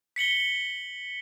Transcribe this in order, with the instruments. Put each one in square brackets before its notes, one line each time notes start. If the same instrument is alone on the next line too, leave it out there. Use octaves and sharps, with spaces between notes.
[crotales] B6 C#7 F#7 G7